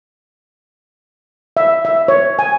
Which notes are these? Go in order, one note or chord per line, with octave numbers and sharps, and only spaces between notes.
E5
E5
C#5
G#5